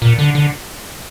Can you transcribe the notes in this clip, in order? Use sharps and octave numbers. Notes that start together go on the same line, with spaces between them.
A#2
D3
D3